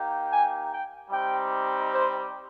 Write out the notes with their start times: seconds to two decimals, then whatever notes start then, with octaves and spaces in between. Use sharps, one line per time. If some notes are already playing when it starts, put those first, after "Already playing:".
Already playing: A#3 D#4 G4
0.30 G#5
0.70 G5
1.10 G3 C4 D#4 G4 G5
1.91 C5